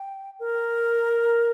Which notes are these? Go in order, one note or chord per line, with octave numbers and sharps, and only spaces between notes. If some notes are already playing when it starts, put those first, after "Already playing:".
Already playing: G5
A#4